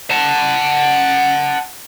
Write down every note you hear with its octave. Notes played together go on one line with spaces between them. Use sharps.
F#5 A5